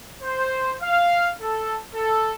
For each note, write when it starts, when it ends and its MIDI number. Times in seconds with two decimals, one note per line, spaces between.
0.22 0.73 72
0.82 1.28 77
1.41 1.78 69
1.94 2.33 69